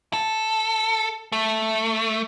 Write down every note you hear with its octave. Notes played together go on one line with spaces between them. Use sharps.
A4
A3